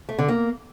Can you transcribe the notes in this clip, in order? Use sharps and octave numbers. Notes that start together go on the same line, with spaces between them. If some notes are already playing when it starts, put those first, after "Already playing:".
A3
D3
A#3